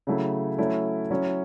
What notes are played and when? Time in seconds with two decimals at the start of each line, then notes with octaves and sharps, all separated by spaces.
0.07 C#3 F#3 A3 E4
0.58 F#3 A3 C#4 E4
1.11 F#3 C#4 E4